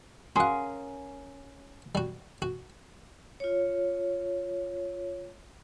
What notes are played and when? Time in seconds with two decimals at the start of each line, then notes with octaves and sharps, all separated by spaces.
0.36 C#4 F#4 G#4 A#4 F5 F#5 C6
1.95 G3 F#4
2.42 F#4
3.40 F4 C#5